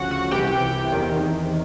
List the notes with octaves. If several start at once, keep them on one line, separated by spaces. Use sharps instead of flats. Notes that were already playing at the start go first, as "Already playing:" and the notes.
Already playing: D2 C#3 F3 F#4 F#5
F#4 F#5
C2 C3 E3 G4 G5
E2 C3 D#3